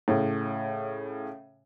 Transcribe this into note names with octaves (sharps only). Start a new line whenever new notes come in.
A2 C#3